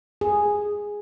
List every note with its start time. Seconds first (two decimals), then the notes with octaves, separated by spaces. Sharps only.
0.21 G#4